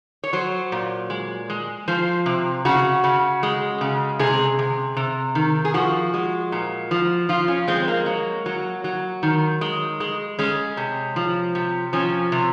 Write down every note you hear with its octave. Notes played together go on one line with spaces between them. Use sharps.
C#5
F#3 C5
A#2
G#3
G#3
F3 C5
C3
C#3 F#4
C#3
G#3
C#3
C3 G#4
C3
C3
D#3
G#4
F3 F#4
G#3
A#2
F3
F3 F4
C#4
G#3 C4
A#3
F#3
F#3
F#3
D#3
G#3
G#3
G#3 C#4
C3
F3
C3
F3 C#4
C3